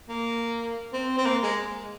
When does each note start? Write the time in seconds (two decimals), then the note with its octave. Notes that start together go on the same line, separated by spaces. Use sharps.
0.09 A#3
0.93 C4
1.18 C4
1.26 A#3
1.43 G#3